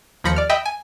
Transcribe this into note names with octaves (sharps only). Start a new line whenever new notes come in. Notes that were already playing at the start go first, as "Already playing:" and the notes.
D#2 F3 B5 A#6 C#7
D5 F6
D#5 E5 G5 B5
G#5